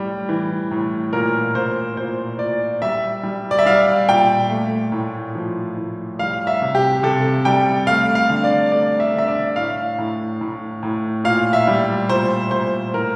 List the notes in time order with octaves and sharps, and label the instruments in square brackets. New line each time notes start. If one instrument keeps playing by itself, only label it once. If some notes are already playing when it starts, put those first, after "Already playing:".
Already playing: [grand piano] A2 G3
E3
A2
A#2 A#4
A#2 C5
A#2 C5
A#2 D5
G3 E5
G3
D5
E5
G3 F5
A#2 G5
A3
A2
F3
A2
G3 F5
E5
C3
G4
C3 A4
G3 G5
A3 F5
F5
D3
D5
A3 D5
E5
D3 E5
D5
A2 F5
A2
A2
A2
A#2 F5
E5
G3
A#2 C5
A#2 C5
A2 A#4